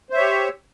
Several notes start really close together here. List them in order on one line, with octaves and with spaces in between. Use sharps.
C5 E5 C#5 G4